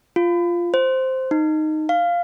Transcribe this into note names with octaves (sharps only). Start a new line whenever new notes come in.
F4
C5
D#4
F5